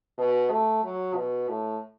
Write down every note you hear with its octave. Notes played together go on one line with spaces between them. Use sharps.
B2
A3
F#3
B2
A2